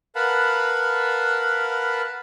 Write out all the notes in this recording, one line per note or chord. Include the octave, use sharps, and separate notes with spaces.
A#4 B4 F5 F#5 A5 B5